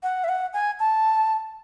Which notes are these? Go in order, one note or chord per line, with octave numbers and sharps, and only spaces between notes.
F#5
E5
F#5
G#5
A5